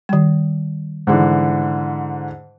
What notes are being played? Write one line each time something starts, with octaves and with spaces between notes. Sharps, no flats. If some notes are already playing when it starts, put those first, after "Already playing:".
D#3 G3
G#2 D3 E3